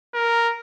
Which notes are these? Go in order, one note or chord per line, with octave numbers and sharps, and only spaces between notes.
A#4